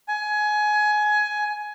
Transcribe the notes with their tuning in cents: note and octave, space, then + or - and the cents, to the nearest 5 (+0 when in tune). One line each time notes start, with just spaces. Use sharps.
G#5 +20